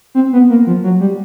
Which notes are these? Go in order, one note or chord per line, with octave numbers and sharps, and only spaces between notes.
C4
B3
A#3
F3
F#3
G3